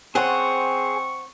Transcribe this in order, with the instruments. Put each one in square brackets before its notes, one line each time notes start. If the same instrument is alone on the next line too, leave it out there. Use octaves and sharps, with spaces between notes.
[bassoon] C4 [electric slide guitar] G#4 C#5 [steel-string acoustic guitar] C5 F#5 [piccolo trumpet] C#6